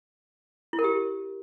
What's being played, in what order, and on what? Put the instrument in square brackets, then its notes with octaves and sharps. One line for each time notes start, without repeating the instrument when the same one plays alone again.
[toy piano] E4
A#4
G4